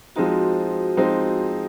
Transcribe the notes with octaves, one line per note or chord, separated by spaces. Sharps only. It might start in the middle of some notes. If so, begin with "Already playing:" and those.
F3 G#3 C4 D#4 F#4
F3 G#3 C4 D#4